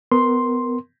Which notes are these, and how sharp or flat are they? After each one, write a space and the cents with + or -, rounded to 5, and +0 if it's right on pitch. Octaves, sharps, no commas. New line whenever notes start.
B3 +25 A#4 +0 C6 +0